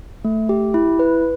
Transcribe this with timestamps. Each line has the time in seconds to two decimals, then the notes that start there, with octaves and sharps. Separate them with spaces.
0.25 A3
0.49 G4
0.74 E4
0.99 B4